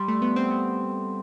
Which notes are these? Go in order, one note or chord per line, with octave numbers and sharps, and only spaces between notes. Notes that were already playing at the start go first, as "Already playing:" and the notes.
Already playing: G3 C6
A3
B3
C4
B3